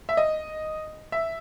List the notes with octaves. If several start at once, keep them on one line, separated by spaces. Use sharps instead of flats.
E5
D#5
E5